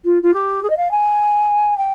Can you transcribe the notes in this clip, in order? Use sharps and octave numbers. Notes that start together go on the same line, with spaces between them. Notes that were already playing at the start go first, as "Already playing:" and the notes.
F4
F4
G4
G#4
D#5
F5
G#5
G5